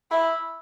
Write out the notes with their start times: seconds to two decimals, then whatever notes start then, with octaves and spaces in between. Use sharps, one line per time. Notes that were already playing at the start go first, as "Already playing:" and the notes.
0.11 E4